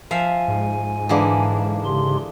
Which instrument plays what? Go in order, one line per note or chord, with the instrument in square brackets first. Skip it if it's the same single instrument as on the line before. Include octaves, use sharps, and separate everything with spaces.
[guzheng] F3 E5 F5 [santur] C5 [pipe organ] G#5
[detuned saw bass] G#2
[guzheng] D3 E3 A#3 [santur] D4 G#4 B4
[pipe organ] C#3 G4 C6